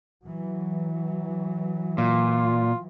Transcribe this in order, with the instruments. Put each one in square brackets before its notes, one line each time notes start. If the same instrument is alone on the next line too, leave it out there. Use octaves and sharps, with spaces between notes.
[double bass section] E3 F#3
[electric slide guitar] A#2 [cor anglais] F4